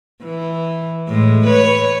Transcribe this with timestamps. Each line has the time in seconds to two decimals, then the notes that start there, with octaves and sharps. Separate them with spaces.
0.24 E3
1.08 A2 G#3
1.47 B4 C#5